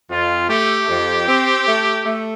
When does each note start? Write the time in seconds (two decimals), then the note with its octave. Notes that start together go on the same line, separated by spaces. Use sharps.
0.10 F2 F4
0.50 A3 G4
0.89 F2
1.28 C4
1.67 A3
2.06 A3